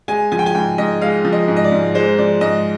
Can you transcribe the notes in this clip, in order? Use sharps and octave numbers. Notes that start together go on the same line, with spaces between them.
G#3 G#5
F3 G#5
G5
G#5
G#2 G5
G#2 D#5
G#3 F5
F3
D#5
G#2
D#5
D5
G#2
G#3 C5
F3 D5
G#2 D#5